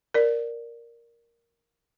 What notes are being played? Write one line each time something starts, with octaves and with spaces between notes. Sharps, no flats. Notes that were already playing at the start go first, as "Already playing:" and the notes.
A#4 D5